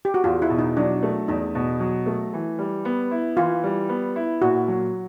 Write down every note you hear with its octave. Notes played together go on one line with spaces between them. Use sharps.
G4
F#4
E2 F4
E4
B2
D#4
F#3 D4
A3
E2 D#4
B2
F#3
A3
E3
G3
B3
E4
E3 F4
G3
B3
E4
A#2 F#4
F#3